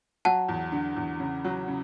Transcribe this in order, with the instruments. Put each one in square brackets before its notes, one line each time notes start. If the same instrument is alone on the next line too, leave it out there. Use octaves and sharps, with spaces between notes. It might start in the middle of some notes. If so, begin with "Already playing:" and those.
[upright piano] F#3 [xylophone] F#5 A5
[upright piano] E2
D3
E2
C#3
F#3
C#3